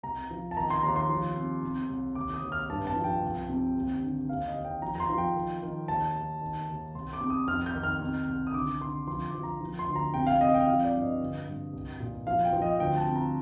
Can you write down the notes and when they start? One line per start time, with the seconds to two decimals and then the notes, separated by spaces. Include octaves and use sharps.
0.03 C2 A#5
0.30 F3
0.51 A5
0.57 D#3 A#5
0.70 C6
0.83 D#2 A#5
0.96 C6
1.09 F3
1.37 C3
1.62 C3
1.90 C2
2.15 D#2 D6
2.34 D#6
2.42 D#2
2.52 F6
2.70 G2 A5
2.87 A5
2.96 F3
3.04 G5
3.23 C2
3.49 C3
3.76 D#2
4.03 D3
4.28 D#2 F5
4.47 D#5
4.56 D#2
4.65 G5
4.82 F3 A#5
4.95 A#5
5.00 C6
5.09 F3
5.18 G5
5.35 D#3
5.62 D#3
5.88 D#2 A5
6.16 D#2
6.41 D#3
6.69 D#2
6.95 C2 C6
7.13 D6
7.21 C3
7.30 D#6
7.48 F2 F6
7.66 G6
7.75 D#3
7.83 F6
8.01 C3
8.27 C2
8.47 D#6
8.54 D3 D6
8.81 D3 C6
9.07 F3 C6
9.25 D6
9.34 F3
9.43 A#5
9.61 F3
9.79 C6
9.88 D2
9.96 A#5
10.14 C3 G5
10.27 F5
10.41 C3 D#5
10.54 G5
10.67 F3 F5
10.85 D5
10.94 G2
11.02 D#5
11.21 D3
11.47 G2
11.73 C2
12.00 A#2
12.27 F3 F5
12.45 G5
12.53 F3
12.62 D#5
12.79 D2 G5
12.97 A5
13.07 C3
13.15 A#5